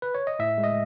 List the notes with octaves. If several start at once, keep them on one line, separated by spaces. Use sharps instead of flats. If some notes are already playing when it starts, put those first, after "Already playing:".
B4
C#5
D#5
A2 E5
G#3
D#5